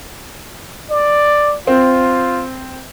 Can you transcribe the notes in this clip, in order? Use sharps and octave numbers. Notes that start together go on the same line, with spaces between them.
D5
C4 F4